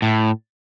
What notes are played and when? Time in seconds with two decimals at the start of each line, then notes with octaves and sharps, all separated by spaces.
0.02 A2